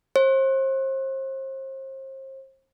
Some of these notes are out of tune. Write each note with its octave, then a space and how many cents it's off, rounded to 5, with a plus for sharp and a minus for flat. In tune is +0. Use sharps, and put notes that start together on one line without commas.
C5 +35